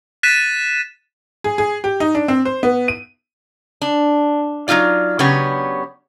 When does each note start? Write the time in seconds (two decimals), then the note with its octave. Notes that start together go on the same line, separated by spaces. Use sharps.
0.23 F#6 A6 B6 D#7 E7
1.44 G#4
1.58 G#4
1.84 G4
2.00 D#4
2.15 D4
2.28 C4
2.45 C5
2.63 B3
2.88 D#7
3.82 D4
4.68 F#3 C4 D#4 F4 D5
5.19 C#3 F#3 B3 D4 G4 C#5